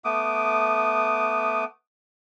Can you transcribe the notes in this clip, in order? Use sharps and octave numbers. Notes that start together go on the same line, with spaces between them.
A3 B3 D6 D#6